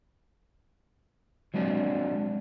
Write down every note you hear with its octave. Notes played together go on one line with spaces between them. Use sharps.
F#3 G#3 C4 D4 F#4